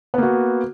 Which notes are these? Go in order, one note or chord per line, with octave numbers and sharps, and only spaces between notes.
A#3 B3 F#4